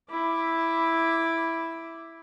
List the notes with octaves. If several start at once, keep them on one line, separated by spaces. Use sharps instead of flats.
E4 D6